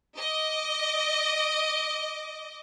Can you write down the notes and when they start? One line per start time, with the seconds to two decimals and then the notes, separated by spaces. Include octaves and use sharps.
0.17 D#5 D6